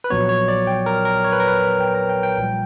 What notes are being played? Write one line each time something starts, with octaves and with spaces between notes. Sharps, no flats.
B4
A#1 A#2 F#3 B3 C#5
C#5
D5
G5
A#4
A#4
C#5
B4
A#4
B4
G5
A#5
G5
G5
A#1 A#2 G3 G5